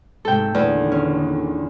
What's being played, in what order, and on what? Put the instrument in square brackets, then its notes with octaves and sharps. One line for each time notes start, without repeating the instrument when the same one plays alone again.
[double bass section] G#2 C3 A3 [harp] A4 G5
[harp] E2 [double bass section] A#2 D3 D#3
[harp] C#4